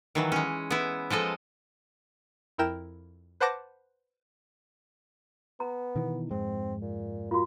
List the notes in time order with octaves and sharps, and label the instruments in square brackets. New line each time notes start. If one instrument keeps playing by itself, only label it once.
[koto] D#3 E3 F#3
G#3 C#4
B3 E4
F3 G#3 A4 D#5
[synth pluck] F2 E4 A#4 G5 E7
B4 C5 F#5 A5 D6 A#6
[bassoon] B3 [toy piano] A#5
[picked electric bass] B2 D#3 E3
[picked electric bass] F2 G#2 G#3 [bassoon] C4
[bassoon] A#2
[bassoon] A#3 [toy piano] F4 F#4